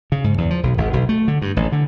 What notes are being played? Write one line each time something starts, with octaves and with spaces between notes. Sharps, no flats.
C#3
G#2
E2
F3
B1
G#1
B1
A3
D3
G2
A1
D3